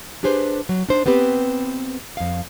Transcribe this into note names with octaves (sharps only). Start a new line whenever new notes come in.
D4 G4 G#4 B4 C5
F#3
D4 D#4 C5
B3 C4 G4 B4
F2 F5